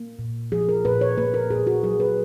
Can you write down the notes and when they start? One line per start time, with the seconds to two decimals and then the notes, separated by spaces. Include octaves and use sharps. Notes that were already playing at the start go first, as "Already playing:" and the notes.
Already playing: A#3
0.19 A#2
0.52 F3 G#4
0.69 A#4
0.85 A#2 B4
1.01 C#5
1.18 A#3 B4
1.34 A#4
1.51 A#2 G#4
1.67 F#4
1.83 F#3 G#4
2.00 B4